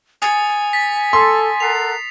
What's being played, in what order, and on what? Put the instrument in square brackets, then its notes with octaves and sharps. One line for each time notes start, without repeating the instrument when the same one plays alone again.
[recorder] G#5 [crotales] D#6 A6 C#7
[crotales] A6 B6
[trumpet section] A4 [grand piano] C6
[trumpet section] A4 A#4 F#5 [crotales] C7 F7